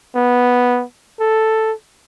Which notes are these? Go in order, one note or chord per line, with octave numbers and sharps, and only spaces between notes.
B3
A4